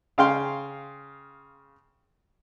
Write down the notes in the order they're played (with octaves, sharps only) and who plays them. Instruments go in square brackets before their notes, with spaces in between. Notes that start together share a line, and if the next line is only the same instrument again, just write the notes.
[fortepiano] C#3 F5 G5 C6